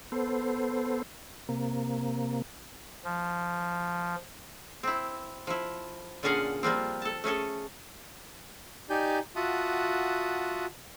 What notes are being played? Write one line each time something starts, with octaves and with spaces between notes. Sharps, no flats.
B3 A4 C5
C3 A#3
F3
C4 E4
F3 E4
A#2 D3 C#4 G#4 F5 F#5
F3 G3 A#3 C4
A4 A5
A3 C#4 G#4 A4
D#4 G4 D5 G#5 G6
F4 F#4 E5 F#5 A5 D#6